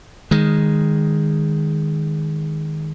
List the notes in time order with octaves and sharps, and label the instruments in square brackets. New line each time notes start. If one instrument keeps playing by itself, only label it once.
[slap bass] D#3 G#3